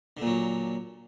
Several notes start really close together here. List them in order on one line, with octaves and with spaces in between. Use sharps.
D3 A#2 F#3